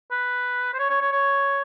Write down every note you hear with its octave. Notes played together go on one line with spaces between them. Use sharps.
B4
C5
C#5
C#5
C#5
C#5